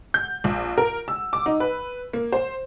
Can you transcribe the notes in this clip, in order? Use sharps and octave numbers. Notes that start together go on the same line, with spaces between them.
G6
A#1
A#4
E6
D6
D#4
B4
A#3
C5